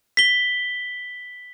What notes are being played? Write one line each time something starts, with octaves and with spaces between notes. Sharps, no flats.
B6 G7